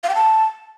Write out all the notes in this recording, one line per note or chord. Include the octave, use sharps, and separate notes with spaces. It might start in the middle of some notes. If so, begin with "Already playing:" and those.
F5
G5
A5